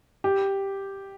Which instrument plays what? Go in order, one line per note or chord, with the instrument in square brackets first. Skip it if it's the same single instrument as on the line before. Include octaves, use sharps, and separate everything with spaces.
[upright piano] G4